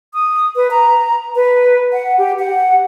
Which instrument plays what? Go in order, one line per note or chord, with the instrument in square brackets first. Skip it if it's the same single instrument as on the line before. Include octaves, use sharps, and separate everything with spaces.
[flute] D#6
B4
A#5
B4
F#5
G4
F#5